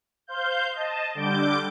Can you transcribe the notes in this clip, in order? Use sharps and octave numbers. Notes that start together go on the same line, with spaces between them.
C5 F5 G6
D#5 A5
D3 G3 D6 G6 D7